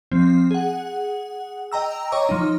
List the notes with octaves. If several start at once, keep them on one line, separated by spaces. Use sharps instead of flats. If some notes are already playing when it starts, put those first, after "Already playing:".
F3 C4
G#4 F#5
D#5 G5 A#5 E6
C#5 D#5 A#5 C#6 D6
F3 D#4